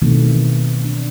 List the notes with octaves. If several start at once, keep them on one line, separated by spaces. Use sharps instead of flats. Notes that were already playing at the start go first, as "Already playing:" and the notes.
B2 D#3 E3 A3 C4
D4